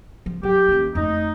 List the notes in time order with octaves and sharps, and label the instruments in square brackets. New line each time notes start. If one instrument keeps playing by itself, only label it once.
[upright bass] F3
[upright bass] F#3 [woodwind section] G4
[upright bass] D#2 C#4
[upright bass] F2 A3 [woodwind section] D#4